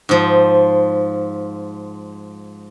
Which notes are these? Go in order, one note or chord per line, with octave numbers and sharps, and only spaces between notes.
G#2 F3